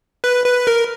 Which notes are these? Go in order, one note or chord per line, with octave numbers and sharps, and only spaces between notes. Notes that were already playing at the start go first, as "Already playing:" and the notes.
B4
B4
A#4